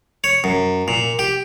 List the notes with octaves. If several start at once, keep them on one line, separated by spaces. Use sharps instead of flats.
C#5
F#2
A#2
G4